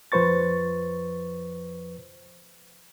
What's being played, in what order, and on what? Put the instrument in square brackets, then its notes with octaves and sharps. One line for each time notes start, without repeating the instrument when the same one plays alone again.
[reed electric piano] F2 F3 B4 C5 C#6 A6